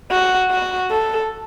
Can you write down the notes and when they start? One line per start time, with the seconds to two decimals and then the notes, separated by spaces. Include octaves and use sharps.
0.11 F#4
0.51 F#4
0.91 A4